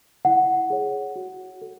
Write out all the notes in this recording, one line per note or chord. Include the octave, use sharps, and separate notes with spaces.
E4 F#5
G#4 C#5
F#4
A4